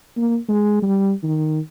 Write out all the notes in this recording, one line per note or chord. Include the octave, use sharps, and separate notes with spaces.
A#3
G#3
G3
D#3